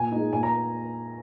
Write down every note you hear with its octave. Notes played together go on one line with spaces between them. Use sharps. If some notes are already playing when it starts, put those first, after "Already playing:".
Already playing: A#2 G#5
G#3 D#4
A#2 G#5
A#5